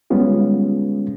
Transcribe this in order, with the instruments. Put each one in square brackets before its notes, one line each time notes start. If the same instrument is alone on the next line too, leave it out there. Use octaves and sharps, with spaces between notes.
[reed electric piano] D3 G3 G#3 B3 C#4 F4